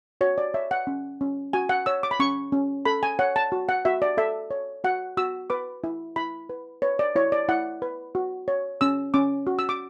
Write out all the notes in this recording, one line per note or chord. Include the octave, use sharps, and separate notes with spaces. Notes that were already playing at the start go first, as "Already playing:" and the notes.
F#4 C#5
D5
C#5 E5
F#5
C#4
C#4
F#4 G#5
F#5
C#5 E6
D6
B5
C#4 C#6
C#4
A4 B5
G#5
C#5 F#5
A5
F#4
F#5
F#4 E5
D5
A4 E5
C#5
F#4 F#5
F#4 E6
B4 D6
E4
E4 B5
B4
B4 C#5
D5
E4 C#5
D5
E4 F#5
B4
F#4
C#5
C#4 E6
C#4 D6
F#4
E6
D6